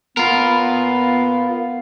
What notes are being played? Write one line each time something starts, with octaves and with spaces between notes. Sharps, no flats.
B3 F4 A#4